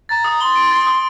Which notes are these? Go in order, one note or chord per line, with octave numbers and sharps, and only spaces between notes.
A#5 A6
D#6
C6 G7
D7
A6
D#6